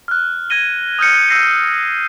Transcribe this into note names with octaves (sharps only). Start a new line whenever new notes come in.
F6 F#6
F6 G#6 A#6 D#7 G7
D#6 F6 G6 C#7
E6 G6 A#6 C7 C#7 D#7